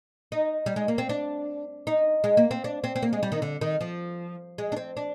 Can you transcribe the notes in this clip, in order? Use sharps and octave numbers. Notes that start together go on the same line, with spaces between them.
D#4
G3
G#3
A#3
C4
D4
D#4
G#3
A#3
C4
D4
C4
C4
A#3
G#3
G3
D#3
D3
D#3
F3
G#3
D4
C4
D4